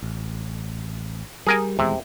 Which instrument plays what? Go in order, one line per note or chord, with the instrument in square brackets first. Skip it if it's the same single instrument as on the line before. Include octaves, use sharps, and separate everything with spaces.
[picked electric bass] A1
[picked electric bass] G3 [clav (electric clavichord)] G#4 A#4 G#5
[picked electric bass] D#1 E2 G#3 [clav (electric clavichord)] C3